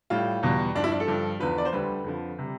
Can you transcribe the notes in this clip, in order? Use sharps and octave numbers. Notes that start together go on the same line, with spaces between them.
A2 G3 F4
E2 B2 G3
G2 F3 D4
E4
D4
A4
G2 F3
E2 D3 F3 B4
D5
C5
D2 D3 G3 B4
F2 D3 F3
C3 G3